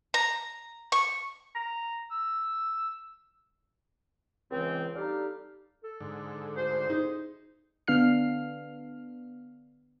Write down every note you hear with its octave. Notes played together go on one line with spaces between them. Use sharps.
A#5
C#6
A#5
E6
C#2 E3 C4
G3 D4 D#4 G4 A4 F5
A4
G#2 D3
D2 C5
D#4 G#4
D3 B3 D4 F5 F6 C7